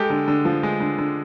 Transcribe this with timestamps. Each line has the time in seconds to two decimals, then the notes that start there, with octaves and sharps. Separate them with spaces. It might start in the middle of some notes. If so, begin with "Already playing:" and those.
Already playing: G#3 G4 A4
0.10 D3
0.28 D3
0.45 F3
0.63 G#3
0.80 D3
0.98 D3